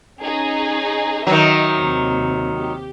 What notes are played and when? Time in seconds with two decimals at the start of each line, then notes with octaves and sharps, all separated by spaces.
0.22 C#4 D#4 G#4
1.27 D#3 F#3 D#5 E5
1.76 D#2 C3
2.57 G4